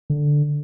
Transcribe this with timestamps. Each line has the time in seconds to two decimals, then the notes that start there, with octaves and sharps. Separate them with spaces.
0.10 D3